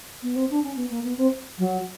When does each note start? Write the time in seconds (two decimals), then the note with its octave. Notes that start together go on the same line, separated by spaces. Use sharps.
0.22 B3
0.36 C4
0.50 D4
0.63 C#4
0.76 B3
0.90 A#3
1.04 B3
1.17 C4
1.59 F#3